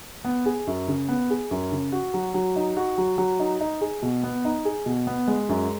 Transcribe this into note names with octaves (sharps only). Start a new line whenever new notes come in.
B3
G#4
F#2
C#3
B3
G#4
F#2
C#3
F#4
F#3
F#3
D#4
F#4
F#3
F#3
D#4
D#4
G#4
B2
B3
D#4
G#4
B2
B3
G#3
F#2